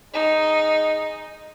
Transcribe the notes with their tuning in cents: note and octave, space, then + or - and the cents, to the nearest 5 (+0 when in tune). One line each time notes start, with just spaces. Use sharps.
G#3 +0 D#4 +0